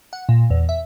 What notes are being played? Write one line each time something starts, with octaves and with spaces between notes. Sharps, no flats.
F#5
A#2
E2
E5